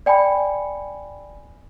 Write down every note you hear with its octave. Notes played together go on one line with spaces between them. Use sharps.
D5 G5 G#5 B5